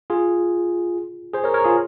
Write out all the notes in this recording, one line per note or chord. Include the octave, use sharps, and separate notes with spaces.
F4 G#4
G#4 C5
A#4 C#5
A#4 C#5
F4 G#4